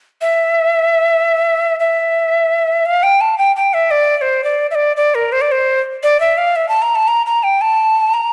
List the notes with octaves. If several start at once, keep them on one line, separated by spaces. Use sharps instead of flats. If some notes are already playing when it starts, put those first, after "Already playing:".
E5
E5
F5
G5
A5
G5
G5
E5
D5
D5
C5
D5
E5
D5
D5
A#4
C5
D5
C5
D5
E5
F5
E5
A5
A#5
A5
A#5
A#5
G5
A5
A#5